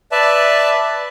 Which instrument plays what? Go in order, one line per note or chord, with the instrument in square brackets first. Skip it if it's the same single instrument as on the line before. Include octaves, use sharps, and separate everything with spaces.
[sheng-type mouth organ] B4 D5 E5 A5